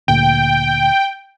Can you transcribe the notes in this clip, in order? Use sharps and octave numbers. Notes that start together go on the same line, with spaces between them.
D2 A#2 G5